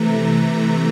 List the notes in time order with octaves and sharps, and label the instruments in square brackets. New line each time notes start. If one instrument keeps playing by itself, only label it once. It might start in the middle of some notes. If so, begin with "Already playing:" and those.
Already playing: [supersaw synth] C3 E3 A3 A#5